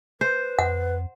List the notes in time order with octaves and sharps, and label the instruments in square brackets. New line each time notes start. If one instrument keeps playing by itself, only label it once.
[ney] B4 [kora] C5
[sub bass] F2 [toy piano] F#5